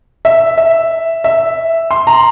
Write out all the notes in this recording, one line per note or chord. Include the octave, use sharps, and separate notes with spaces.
E5
E5
E5
C6
A#5